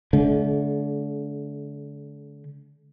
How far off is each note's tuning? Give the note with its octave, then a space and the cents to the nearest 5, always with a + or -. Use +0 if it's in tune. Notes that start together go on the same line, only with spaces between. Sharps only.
D3 -35 G#3 +45